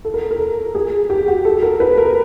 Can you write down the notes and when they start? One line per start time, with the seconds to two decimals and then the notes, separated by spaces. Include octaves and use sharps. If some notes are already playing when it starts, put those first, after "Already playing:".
0.05 A4
0.14 A#4
0.31 A#4
0.40 A4
0.75 G#4
1.10 G4
1.28 F#4
1.45 A4
1.62 A#4
1.80 B4
1.98 A#4